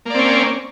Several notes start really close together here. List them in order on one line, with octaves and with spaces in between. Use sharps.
A#3 D5 C4 C#4